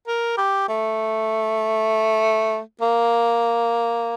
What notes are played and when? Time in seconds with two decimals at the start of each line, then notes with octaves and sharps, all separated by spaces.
0.07 A#4
0.38 G4
0.69 A3
2.81 A#3